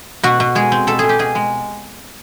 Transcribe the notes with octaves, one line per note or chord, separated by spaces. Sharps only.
B2 F#4
B2
G#3 G#4
C4
B2 A4
B2 G#4
G4
B2 G#4
G#3